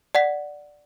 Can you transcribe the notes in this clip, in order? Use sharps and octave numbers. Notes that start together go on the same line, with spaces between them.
D5 F#5 B6